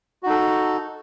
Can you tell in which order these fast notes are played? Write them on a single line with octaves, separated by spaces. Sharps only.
F#4 D#4 A4